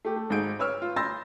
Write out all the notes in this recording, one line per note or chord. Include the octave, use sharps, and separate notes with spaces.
A3 G4
A3
G#1 G#2 D#4 G#4 G6 D7
B4 C#5 E6 F6
F4
B5 C6 E6 G6 A6 A#6